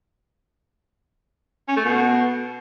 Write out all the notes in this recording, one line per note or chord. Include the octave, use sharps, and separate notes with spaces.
C#4
A3
B2